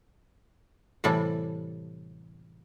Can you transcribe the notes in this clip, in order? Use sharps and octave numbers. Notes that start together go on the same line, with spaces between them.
A2 C3 E3 G3 A4